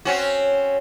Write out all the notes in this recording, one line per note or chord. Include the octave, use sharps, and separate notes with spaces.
C4 C#4 F#4